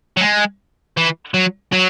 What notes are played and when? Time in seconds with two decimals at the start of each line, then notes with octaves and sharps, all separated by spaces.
0.17 F#3
0.21 G#3
0.97 E3
1.34 F#3
1.72 F#3